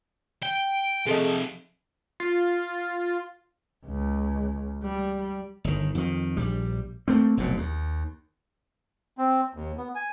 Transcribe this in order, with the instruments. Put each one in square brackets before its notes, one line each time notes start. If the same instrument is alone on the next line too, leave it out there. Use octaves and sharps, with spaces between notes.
[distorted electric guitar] G5
[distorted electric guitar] C3 F3 [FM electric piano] G#4 A4 D#5
[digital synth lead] F4
[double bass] C#2
G3
[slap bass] G1 D#3
F2 D#3
A#1 G3
A3 A#3 C4
F1 B1 F#2 A#2
D#2
[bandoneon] C4
D#2
B3
G#5